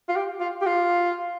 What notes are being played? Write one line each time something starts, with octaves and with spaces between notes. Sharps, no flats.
F4
G4
F4
G4
F4